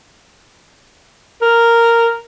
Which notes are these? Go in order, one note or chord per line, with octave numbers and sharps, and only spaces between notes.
A#4